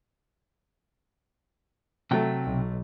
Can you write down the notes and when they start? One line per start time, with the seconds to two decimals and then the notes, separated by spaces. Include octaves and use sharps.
2.11 C3 F#3 A3 G5
2.45 B1